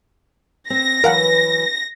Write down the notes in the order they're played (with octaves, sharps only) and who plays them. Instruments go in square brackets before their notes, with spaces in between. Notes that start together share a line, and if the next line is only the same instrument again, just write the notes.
[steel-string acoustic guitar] C4 [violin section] A#6
[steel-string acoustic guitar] E3 F#3 B4 [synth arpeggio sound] A#4 F5 F#5